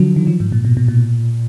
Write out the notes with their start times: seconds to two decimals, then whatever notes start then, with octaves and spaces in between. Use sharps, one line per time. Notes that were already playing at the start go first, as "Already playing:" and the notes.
Already playing: D3 F3 F#3
0.16 D#3
0.27 F3
0.40 G#2
0.52 A#2
0.65 B2
0.77 B2
0.88 A#2